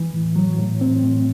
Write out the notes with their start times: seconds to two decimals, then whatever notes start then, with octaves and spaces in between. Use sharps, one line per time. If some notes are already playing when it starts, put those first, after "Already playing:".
Already playing: E3
0.14 A2
0.36 F#3
0.58 A2
0.81 C4
1.04 A2